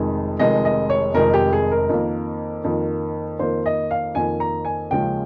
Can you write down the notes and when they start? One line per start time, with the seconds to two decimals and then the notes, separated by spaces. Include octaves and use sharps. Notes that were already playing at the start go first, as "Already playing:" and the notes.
Already playing: F1 F2 D#3 G#3 D#4
0.39 F1 F2 D#3 G#3 D#4 D#5
0.65 D#5
0.90 C#5
1.14 F1 F2 D#3 G#3 D#4 A#4
1.34 G4
1.53 G#4
1.72 A#4
1.89 F2 D#3 A#3
2.64 F2 D#3 A#3
3.39 F2 D#3 A#3 C5
3.66 D#5
3.91 F5
4.15 F2 D#3 A#3 G#5
4.40 A#5
4.65 G#5
4.91 D#2 C#3 F3 G#3 C#4 G5